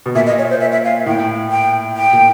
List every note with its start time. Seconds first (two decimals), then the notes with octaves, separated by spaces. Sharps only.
0.06 B2
0.15 A#2 E5
0.27 D#5
0.38 C#5
0.50 C5
0.61 E5
0.72 E5
0.85 F5
1.06 A2 G5
1.52 G5
1.97 G5
2.13 A#2